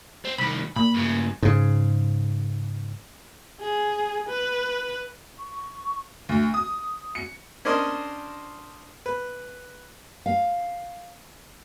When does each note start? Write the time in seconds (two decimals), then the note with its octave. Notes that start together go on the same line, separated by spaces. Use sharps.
0.25 C4
0.38 C2 D#3 B5
0.76 A#2 B5
0.95 G2 C#3
1.43 G#2 C#3
3.61 G#4
4.29 B4
5.39 C#6
6.29 D2
6.54 D#6
7.15 C#7
7.65 C#4 D4 A#4 C5 D#5
9.06 B4
10.26 F5